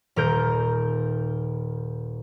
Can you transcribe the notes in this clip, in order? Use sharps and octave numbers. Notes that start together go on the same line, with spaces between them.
D#1 A#4 G6